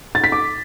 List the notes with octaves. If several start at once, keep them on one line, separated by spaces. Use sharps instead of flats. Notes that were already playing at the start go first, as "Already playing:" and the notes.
A6
B6
D6